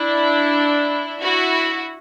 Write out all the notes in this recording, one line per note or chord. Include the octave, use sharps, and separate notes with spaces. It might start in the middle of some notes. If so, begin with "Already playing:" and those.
Already playing: D4 E4
E4 F#4